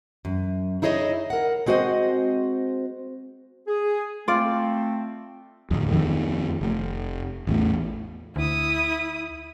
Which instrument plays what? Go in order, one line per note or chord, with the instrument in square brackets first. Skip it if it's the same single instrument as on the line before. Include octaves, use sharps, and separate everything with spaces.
[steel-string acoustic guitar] F#2
D#4 E4 G#4 C#5 D#5
A#4 F#5
G#3 C4 F#4 C5 D#5
[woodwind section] G#4
[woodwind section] A3 C4 [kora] F4 D5
[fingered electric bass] D1 F2
F2 D#3
F1
A1 E2 A2
[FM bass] D2 [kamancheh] E4 D#6